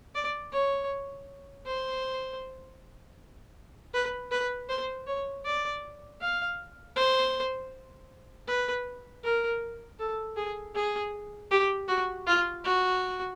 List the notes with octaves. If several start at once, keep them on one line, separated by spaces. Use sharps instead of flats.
D5
C#5
C5
B4
B4
C5
C#5
D5
F5
C5
B4
A#4
A4
G#4
G#4
G4
F#4
F4
F#4